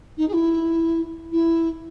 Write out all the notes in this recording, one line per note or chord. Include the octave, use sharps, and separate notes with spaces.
D#4
G#4
E4
E4